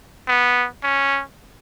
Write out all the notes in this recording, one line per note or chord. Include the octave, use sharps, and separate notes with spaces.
B3
C#4